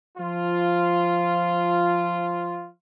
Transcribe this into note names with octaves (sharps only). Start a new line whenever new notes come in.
F3 F4